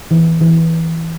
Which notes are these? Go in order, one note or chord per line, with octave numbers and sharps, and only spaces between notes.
E3
E3